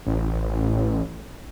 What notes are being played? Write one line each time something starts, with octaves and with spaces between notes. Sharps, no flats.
A1